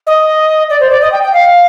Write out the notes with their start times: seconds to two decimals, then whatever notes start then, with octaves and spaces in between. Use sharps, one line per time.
0.07 D#5
0.70 D5
0.80 C5
0.91 D5
1.02 D#5
1.12 G5
1.23 G5
1.33 F5